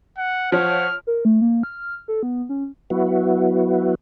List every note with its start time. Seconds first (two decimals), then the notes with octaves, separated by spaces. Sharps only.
0.18 F#5
0.52 F3 F4 C5 C#5 F#5 F6
1.07 A#4
1.25 A3
1.41 A#3
1.63 F6
2.08 A4
2.23 B3
2.49 C#4
2.90 F#3 B3 E4 F#4